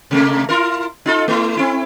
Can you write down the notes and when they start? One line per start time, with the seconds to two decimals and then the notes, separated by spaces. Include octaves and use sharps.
0.11 C3 A3 A#3
0.49 E4 F4 A#4
1.06 D#4 F4 A4
1.28 A3 E4
1.57 C4 E4